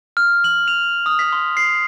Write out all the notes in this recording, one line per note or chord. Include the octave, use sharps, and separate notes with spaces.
F6
F#7
F7
D#6
B6
C6
C7